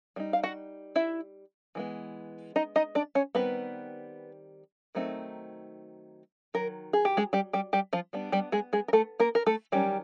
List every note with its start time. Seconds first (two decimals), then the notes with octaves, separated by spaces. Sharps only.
0.16 G3 B3 D#4
0.33 F5
0.43 F#4 F#5
0.96 E4 E5
1.75 E3 G#3 B3
2.56 D#4 D#5
2.76 D#4 D#5
2.95 D4 D5
3.15 C#4 C#5
3.35 D#3 G3 B3 C4 D#4 B4
4.95 D#3 F#3 A3 C4 D#4
6.54 D#3 F#3 A#4
6.93 G#4
7.05 G4
7.17 G#3 G#4
7.33 G3 G4
7.53 G3 G4
7.73 G3 G4
7.93 F3 F4
8.13 G3 B3 D4
8.32 G3 G4
8.52 G#3 G#4
8.73 G#3 G#4
8.88 A#4
8.93 A3 A4
9.20 A#3 A#4
9.35 A#4
9.46 A3 A4
9.72 D#3 F#3 G3 C#4 G4